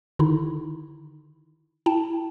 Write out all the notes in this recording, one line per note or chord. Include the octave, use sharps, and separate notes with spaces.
D3 D#3 D#4 E4
E4 G5 A5